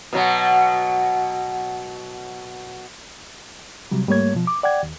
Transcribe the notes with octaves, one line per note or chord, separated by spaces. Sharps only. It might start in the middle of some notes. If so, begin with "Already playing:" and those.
B2 F#3
C3 F#3 G3
G#2 G3 A3 A#3 C#5 G#6
B2 F3
D6
D5 F#5 G5 G#6
D#2